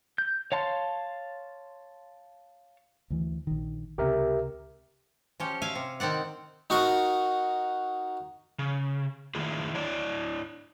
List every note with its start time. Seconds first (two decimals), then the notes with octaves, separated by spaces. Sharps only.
0.18 G6
0.52 C#5 F5 A5 C6
3.10 D2 E3
3.47 A#1 D#3
3.98 C#2 C3 G4 A#4 E5
5.40 F3 C#4 G4
5.62 E5 F5 G#5
5.75 C3
6.00 D#3 C4 D5 F#5
6.70 D#4 F#4 A#4 F#5 C#6
8.59 C#3
9.35 D#3 A#3 E4 F4 G#4
9.75 D4 E4 C#5 D5